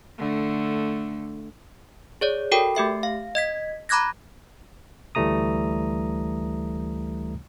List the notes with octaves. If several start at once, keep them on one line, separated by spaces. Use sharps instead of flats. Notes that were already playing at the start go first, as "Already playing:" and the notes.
D3 A3
G#4 C#5 D5
F#4 A4 A#4 G5
A3 G4 E5 C7
F5
D#5 G#6 B6
A#5 B5 D6 F#6 G#6 A#6
D2 E3 G3 A3 A#5 D#6